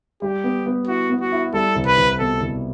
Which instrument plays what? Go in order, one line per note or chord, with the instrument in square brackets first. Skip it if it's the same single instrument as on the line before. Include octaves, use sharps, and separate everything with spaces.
[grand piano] G3 [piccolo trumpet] G4
[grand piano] B3
B3
[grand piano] E4 [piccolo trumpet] F#4
[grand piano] B3
[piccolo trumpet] F#4
[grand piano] E4
[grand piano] G3 [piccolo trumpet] A4
[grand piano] C2
[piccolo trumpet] B4
[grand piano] C2
[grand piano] B2 [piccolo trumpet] A4
[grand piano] C2